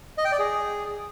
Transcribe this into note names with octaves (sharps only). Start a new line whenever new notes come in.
D#5
G5
D5
G#4